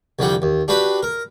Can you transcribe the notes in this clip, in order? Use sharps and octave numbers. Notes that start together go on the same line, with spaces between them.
C2 F2 D3 G3 F#5 G5
D#2
D4 F#4 G4 B4 B5
A#4